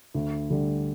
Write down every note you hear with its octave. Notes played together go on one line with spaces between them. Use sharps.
D2
D3 G3